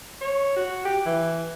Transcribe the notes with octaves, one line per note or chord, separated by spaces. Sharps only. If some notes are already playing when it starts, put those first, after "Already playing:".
C#5
F#4
G4
E3